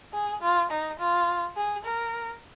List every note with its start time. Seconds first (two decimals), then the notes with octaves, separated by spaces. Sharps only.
0.13 G#4
0.41 F4
0.71 D#4
0.99 F4
1.56 G#4
1.85 A#4